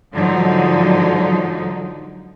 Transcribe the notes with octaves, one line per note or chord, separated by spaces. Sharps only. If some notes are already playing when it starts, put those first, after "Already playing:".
G#2 D3 F3 F#3 D#4